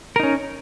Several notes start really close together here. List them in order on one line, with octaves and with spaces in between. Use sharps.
A#4 D#4 C#4